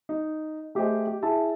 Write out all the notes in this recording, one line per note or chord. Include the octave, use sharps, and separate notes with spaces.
D#4
A3 G4 G#4 C5 D#5 G5
G4
E4 G#4 E5 A5